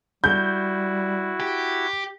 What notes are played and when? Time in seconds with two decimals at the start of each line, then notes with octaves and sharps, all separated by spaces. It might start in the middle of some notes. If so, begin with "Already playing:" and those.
0.24 G3 E4 F#4 G6
1.40 G4